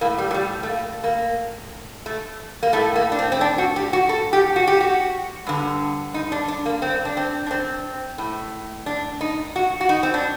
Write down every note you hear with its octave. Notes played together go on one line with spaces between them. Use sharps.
A2 A#3
G3
F#3
G3
A3
A#3
A#3
A3
A#3
A2 A3
A#3
D4
C4
C4
D4
F#4
G4
F#4
A4
G4
F#4
G4
F#4
G2 D3
D#4
D4
D4
A#3
C4
D4
C4
D4
C4
A2
D4
D#4
F#4
F#4
D#4
C4
D4